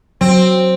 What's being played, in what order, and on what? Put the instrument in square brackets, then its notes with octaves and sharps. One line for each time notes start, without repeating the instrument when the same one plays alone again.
[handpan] F#3 [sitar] C4